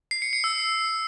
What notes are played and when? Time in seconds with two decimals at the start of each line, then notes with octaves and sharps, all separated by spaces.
0.11 C7
0.22 C#7
0.33 C#7
0.44 E6